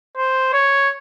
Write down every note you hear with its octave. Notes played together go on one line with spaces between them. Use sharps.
C5
C#5